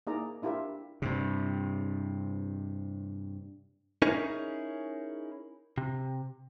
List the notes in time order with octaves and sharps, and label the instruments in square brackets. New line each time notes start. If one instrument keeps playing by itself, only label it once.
[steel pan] A#3 D#4 E4 G#4 D5 A#5
D4 E4 F4 G4 A#4 E5
[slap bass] G2 C3
[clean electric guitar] C#4 D#4 E4 G#4 A#4 C#5
C3